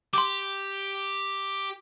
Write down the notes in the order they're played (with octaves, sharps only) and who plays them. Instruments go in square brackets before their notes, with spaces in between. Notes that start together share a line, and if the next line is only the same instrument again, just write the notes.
[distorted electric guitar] G4 [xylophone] C6 D6